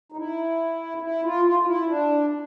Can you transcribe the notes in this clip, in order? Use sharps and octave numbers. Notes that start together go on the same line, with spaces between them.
D#4
E4
E4
F4
F4
F4
E4
D4